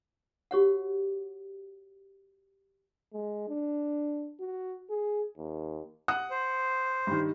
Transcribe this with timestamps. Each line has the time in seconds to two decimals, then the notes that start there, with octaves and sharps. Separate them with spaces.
0.51 F#4 G4 C#5 F#5
3.13 G#3
3.48 D4
4.40 F#4
4.90 G#4
5.37 D#2
6.08 F#5 D#6 F#6
6.31 C5
7.07 G2 D#3